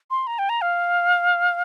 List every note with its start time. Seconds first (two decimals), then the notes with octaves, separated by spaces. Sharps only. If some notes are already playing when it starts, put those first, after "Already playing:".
0.11 C6
0.27 A#5
0.39 G5
0.49 A#5
0.62 F5